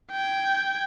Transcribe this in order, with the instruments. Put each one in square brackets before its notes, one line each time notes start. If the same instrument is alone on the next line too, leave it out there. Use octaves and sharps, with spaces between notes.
[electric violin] G5 G#6